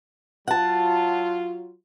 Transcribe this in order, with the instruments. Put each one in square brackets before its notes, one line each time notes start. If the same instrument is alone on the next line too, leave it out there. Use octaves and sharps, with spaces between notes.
[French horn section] F#3 F4 [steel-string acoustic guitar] F#5 A5